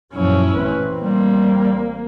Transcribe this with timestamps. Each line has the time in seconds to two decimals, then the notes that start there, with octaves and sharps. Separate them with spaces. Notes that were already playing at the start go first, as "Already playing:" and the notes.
0.14 F#2 A#2 F3 F#3 C#4 E4
0.54 A1 C4 B4
1.03 G3 A#3